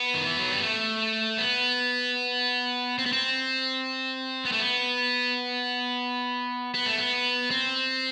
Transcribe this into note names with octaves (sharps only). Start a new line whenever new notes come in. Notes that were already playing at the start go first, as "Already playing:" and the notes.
Already playing: B3
D#3
E3
F#3
G3
A3
B3
C4
B3
C4
B3
A3
B3
B3
A3
B3
C4